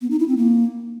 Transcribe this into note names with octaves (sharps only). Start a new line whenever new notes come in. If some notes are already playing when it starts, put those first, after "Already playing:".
B3
D#4
E4
C4
A#3